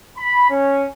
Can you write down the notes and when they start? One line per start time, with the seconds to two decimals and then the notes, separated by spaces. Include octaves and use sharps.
0.17 B5
0.50 C#4